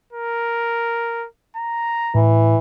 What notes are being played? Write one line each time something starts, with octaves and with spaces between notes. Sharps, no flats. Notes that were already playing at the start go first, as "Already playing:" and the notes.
A#4
A#5
A2 E3